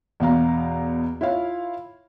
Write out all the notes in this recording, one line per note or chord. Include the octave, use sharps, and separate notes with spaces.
E2 B2 F5 A#5
E4 F4 C#5 F5